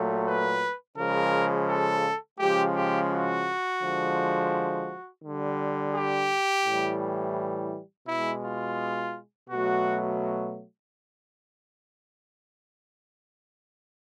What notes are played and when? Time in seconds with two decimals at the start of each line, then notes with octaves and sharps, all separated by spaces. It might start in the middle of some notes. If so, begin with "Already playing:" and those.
Already playing: A#2 F#3 A3
0.26 B4
0.97 C#3 F3 G#3 A#4
1.68 A4
2.39 C#3 F3 G#3 G4
2.76 G4
3.11 F#4
3.82 D3 F3 G#3
5.24 D3 G3
5.95 G4
6.65 A2 E3 G3
8.08 B2 G#3 E4
8.44 F4
9.50 B2 F#3 A3 F#4